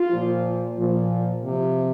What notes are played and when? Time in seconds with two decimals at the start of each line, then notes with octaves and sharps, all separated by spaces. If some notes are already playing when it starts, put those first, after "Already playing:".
Already playing: F4
0.09 A#2 F3
0.77 A#2 F3
1.44 C3 F3